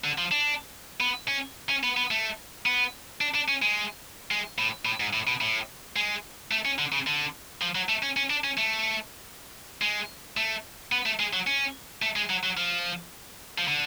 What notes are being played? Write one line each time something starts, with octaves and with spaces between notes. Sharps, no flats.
D3
F3
D4
B3
C#4
C#4
B3
B3
A3
B3
D4
D4
C#4
G#3
G#3
A2
A2
G#2
A2
B2
A2
G#3
A3
C#4
D3
C#3
D3
F3
F#3
A3
C#4
C#4
D4
C#4
A3
G#3
A3
B3
A3
G#3
F#3
C#4
A3
G#3
F#3
F#3
F3
F3
D3